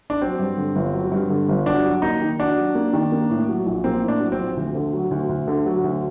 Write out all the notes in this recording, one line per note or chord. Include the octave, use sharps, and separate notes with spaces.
D4
F#3 C4
G2
D3
G1
F#3
G2
D3
G1
D4 F#4
F#3
A#3 D#4
D#3
D4 F#4
F#3
A#3
D#3
A#3
A2
F#3
A#1
A#3 C4
A2
D4
F#3
C4
A#1
D2
D3
F#3
D2
D2
D3
F#3
D2